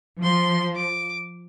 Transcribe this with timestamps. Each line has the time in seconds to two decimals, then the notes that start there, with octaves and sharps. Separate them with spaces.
0.22 F3 C6
0.76 D6